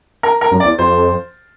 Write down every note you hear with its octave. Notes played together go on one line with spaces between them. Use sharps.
A#4
A#4
F#2
D5
E2
F2 C5